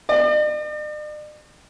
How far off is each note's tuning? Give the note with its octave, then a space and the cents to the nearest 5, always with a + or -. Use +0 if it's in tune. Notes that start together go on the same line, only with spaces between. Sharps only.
D5 +45